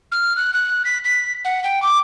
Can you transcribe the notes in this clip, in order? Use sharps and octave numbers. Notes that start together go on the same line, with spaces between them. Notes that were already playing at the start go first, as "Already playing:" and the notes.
F6
F#6
F#6
B6
B6
F#5
G5
D6